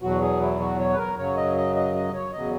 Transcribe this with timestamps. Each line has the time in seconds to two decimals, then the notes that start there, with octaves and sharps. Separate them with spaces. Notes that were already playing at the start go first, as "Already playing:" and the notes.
0.02 E2 B2 F#3 F#4
0.21 G#4
0.41 E4
0.60 F#4
0.79 C#5
0.93 B4
0.98 A#4
1.17 F#2 C#3 F#3 C#5
1.36 D#5
1.56 D#5
1.76 D#5
1.94 D#5
2.14 C#5
2.32 E2 C#3 F#3 D#5